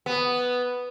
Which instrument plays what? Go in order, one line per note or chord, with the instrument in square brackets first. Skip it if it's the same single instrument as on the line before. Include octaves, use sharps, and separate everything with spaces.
[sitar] B3